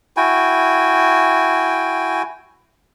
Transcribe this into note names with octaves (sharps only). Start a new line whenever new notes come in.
E4 F#4 G5 G#5